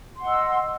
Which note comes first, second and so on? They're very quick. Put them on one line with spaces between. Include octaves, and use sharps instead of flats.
C6 F#5 D#5 E6